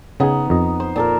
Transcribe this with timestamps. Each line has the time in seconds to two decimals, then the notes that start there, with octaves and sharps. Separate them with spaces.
0.20 C#3 B3 D#4 G#4
0.50 F2 D#5
0.80 C5
0.96 A#2 A4 A#4